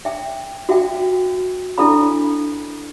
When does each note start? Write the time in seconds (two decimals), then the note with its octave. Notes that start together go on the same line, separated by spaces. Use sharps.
0.05 E5 G5
0.69 F#4 E5 F5 G5
1.78 D4 E4 A4 F5 B5